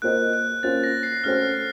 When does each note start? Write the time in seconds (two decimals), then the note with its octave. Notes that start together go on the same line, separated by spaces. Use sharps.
0.02 A#3 F4 C5 D#5 F#6
0.33 F#6
0.63 A#3 C#4 F4 C5 A6
0.84 A#6
1.03 C7
1.24 A3 C#4 F#4 A4 C5 F6